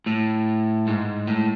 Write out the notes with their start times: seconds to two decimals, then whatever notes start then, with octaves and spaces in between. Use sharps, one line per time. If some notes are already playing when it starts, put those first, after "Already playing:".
0.06 A2
0.87 G#2
1.27 A2